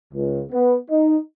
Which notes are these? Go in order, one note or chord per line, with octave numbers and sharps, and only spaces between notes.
C#2
B3
D#4